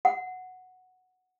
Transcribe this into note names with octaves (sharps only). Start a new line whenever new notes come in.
F#5